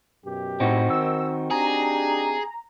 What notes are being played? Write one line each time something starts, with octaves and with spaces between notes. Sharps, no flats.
F#2 B2 G4
A2 C4 D#4 F#4
D#3 E6
D4 G4 G#4 A#5